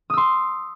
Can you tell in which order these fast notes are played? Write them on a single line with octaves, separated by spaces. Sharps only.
D#6 E6 C6